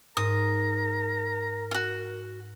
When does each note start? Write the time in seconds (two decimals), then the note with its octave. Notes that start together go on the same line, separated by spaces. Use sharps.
0.17 G#2 A#4 A#5 D#6
1.71 F4 F#4